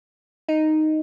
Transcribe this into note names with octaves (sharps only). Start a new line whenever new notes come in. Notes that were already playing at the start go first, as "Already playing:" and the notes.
D#4